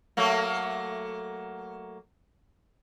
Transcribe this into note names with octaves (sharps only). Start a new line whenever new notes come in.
F#3 A3 A#3